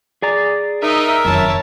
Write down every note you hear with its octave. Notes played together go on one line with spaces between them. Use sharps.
G#4 D5 A#5
D#4 A#4 D#5 E5
F1 F#2 D#3 C#5 A5